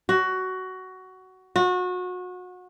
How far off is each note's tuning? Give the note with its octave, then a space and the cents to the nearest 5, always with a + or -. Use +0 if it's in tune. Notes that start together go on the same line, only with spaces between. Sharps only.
F#4 +15
F#4 -30